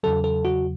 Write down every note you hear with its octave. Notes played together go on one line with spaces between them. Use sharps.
E2 C#3 F#3 A4
A4
F#4